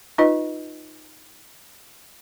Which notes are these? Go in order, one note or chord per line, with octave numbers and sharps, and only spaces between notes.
D#4 F4 B4 D#5